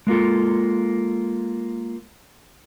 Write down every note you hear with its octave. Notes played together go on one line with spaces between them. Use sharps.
G#3 A#3 F4 A4